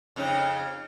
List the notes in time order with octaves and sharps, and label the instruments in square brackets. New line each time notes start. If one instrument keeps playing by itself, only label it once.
[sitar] F2 C#3 D#4